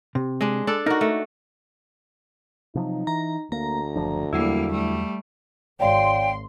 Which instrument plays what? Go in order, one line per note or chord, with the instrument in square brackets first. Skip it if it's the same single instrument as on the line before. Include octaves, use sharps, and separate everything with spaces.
[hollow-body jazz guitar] C3
[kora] G#3 D4
D4 A4
[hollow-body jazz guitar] D#4 [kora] F#4 A#4
[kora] A3
[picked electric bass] C3 F3 F#3 [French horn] D#4
[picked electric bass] E3 [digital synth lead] A#5
[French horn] D2 [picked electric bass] A#3 [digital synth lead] A#5
[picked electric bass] F#1 F3 D4
[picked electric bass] E2 F#3 [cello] G3 A#3 [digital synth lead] E4
[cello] G3 A3
[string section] G#1 C6 [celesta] C#5 D5 F5 [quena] G5